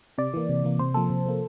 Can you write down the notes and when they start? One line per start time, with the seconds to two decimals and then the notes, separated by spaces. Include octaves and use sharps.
0.18 C3 D5
0.34 E3 A#3
0.49 C3
0.64 E3 A#3
0.79 C3 C5
0.94 F3 A#3 A4
1.10 C3
1.25 F3 A#3